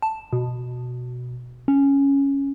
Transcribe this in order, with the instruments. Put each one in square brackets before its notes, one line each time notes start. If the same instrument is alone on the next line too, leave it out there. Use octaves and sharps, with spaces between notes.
[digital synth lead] A5
B2
C#4